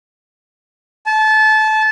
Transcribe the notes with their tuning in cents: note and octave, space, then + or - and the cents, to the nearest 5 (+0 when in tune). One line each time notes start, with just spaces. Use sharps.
A5 -25